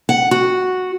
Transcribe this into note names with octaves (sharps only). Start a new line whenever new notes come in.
F#5
F#4